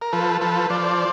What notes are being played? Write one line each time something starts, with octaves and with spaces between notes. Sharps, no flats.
A#4
F3 A4 B4
F3 A4 B4
F3 C5 D5